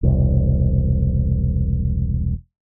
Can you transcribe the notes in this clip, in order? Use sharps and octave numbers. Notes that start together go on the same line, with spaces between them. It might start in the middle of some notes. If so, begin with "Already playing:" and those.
E1 C2